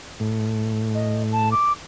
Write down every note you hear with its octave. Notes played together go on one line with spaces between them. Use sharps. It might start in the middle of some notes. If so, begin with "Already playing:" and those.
A2
D#5
A5
D6